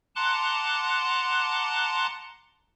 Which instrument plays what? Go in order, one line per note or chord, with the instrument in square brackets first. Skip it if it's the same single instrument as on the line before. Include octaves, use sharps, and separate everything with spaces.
[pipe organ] F#5 A5 A#5 C6 D6 F#6